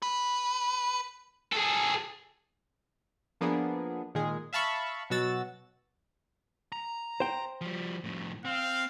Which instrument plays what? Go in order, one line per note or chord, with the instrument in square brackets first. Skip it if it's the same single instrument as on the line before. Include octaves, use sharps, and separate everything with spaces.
[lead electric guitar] B4
[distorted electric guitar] G#4 A4
[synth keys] F3 A#3 B3 D4 G#4
A#2 D#3 G#3 G#4
E5 F5 A5 B5 C#6
B2 F#3 F#4 E6 A6
[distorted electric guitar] A#5
[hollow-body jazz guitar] C5 G5
[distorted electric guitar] F3 G3
F2 A2
[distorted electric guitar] C4 [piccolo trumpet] F5